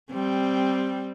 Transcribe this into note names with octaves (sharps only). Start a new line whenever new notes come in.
G3 C4